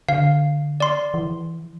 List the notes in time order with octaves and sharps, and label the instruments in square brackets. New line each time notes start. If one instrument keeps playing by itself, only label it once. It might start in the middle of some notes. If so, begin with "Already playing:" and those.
[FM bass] D3 [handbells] F5
[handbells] D5 C6
[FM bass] E3